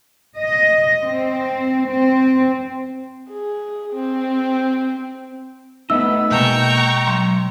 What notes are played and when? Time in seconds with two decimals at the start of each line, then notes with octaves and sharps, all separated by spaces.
0.39 D#5
1.03 C4
1.87 C4
3.30 G#4
3.94 C4
5.90 A3 B3 D#4 D#5 E5 E6
6.30 B2 G#3 A#3 B3 G5 A5 A#5 C#6
7.07 F#3 C6